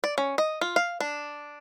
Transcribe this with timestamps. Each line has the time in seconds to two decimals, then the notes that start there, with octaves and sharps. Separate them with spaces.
0.04 D5
0.18 C#4
0.38 D#5
0.61 F4
0.76 F5
1.00 D4